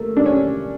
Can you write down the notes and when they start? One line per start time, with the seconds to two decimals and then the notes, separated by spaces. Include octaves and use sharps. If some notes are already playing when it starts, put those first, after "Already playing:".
Already playing: A3 A#3
0.17 D4
0.26 C#4